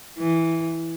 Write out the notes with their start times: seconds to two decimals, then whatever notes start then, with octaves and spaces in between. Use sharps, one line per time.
0.19 E3